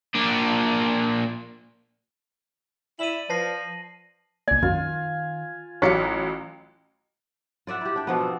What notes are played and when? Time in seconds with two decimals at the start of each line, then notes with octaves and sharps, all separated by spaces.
0.15 A#2 D4
2.99 E4 D5 D#7 F#7
3.30 F3 B4 A5 A#6 C7
4.48 C2 A#3 D5 G#5
4.63 F#2 D#3 F4
5.82 A1 F#3 C#5 D5 F5 B6 C#7
7.67 F4 D5 E5 F#5
7.81 E4 G4
7.96 D4 G5
8.07 B2 F3 B3
8.20 C4